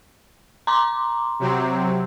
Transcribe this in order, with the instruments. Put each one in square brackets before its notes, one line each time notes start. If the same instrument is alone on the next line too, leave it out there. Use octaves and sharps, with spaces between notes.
[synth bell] A#5 C6 D6
[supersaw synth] C3 F#3 C4